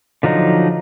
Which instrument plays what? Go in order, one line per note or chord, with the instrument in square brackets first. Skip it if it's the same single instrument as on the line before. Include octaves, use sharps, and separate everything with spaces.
[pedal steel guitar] D3 F3 F#3 D#4